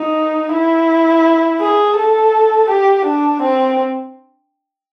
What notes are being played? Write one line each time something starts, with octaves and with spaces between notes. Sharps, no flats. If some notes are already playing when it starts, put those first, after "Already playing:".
Already playing: D#4
E4
G#4
A4
G4
D4
C4